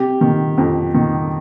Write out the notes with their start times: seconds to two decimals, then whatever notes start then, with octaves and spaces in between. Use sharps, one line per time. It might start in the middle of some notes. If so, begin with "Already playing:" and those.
Already playing: C3 G4
0.21 D#3
0.58 F2
0.94 D#3